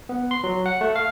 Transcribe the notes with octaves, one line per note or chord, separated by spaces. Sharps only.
B3
C6
F#3
F#5
A3
F5